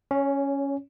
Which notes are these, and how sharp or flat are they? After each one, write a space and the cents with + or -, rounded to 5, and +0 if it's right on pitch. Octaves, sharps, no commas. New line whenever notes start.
C#4 +0 C#5 +30